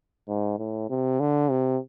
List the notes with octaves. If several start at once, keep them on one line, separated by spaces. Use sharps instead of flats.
G#2
A2
C3
D3
C3